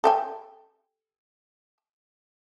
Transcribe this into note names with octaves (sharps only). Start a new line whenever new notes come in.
A4 G5 G#5